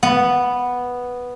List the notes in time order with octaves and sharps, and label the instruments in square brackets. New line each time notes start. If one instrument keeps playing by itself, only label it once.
[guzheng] B3